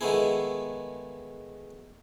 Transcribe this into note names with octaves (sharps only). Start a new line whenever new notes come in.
D#3 G#3 A3 B3 E4 G#4